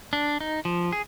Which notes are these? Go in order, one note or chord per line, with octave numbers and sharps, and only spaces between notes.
D4
D#4
F3
G#4